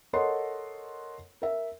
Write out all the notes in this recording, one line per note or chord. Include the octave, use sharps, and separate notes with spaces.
A4 A#4 C#5 D#5 F#5 C6
A#4 E5